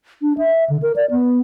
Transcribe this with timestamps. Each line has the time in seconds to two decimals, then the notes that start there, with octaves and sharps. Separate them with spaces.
0.22 D4
0.38 E5
0.70 D3
0.82 A#4
0.96 D5
1.11 B3